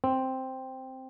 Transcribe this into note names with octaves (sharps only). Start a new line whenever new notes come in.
C4